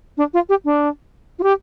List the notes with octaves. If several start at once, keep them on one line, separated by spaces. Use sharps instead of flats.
D4
F4
G4
D4
F4
G4